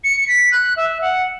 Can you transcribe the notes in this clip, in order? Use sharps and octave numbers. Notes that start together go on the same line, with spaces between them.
C#7
C#7
B6
F#6
E5
F#5